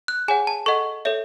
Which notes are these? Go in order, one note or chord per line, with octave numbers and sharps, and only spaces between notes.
F#6
G#4 C#5 F#5 G#5
A5
A4 D#5 F#5 C#6
A4 C#5 E5